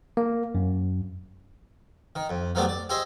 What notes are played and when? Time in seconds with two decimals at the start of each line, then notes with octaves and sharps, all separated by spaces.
0.17 A#3
0.55 F#2
2.15 D#3
2.29 F2
2.55 F3 F#3 A3 B3 D4 G4
2.69 D5
2.89 G4 G#4 C5 D#5 E5